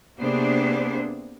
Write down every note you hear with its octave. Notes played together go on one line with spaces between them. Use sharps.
C3 A#3 B3 D4 G#4 C5